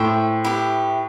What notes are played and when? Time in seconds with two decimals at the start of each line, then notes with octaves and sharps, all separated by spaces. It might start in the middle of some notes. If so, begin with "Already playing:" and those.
Already playing: A2 C5 E5 G5
0.45 E4 G4 B4